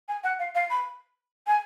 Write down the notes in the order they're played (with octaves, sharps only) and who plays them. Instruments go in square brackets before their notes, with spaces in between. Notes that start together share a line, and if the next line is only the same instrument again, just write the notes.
[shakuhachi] G#5
F#5
F5
F5
B5
G#5